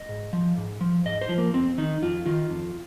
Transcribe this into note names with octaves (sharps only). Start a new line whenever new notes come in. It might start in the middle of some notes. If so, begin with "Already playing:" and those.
Already playing: D#5
G#2
F3
G#2
F3
G#2 D#5
C5
F3
A#3
F2 C4
D#3 D#4
F2 F4
D#3 F4
F2